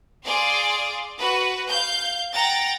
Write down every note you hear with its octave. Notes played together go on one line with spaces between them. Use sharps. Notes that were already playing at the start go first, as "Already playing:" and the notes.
G#4 D5 F5 C6
F#4 B4
F5 G6
F#5 G5 A#5 A6